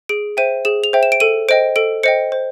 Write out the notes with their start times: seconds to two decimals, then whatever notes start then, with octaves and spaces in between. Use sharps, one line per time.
0.09 G#4 D7
0.37 C5 E5 G5 D#7
0.65 G#4 E7
0.84 F7
0.93 C5 E5 G5
1.03 E7
1.12 D7
1.20 A4 D#7
1.49 C5 D#5 G5 D7
1.76 A4 D7
2.03 C5 D#5 G5 C#7
2.32 C5